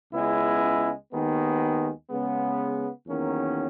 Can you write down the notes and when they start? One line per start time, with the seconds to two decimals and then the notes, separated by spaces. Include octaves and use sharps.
0.12 C#2 C#3 G#3 B3 E4
1.11 D#2 D#3 G#3 B3
2.09 C#3 G#3 B3
3.07 E2 D#3 F#3 A#3 C#4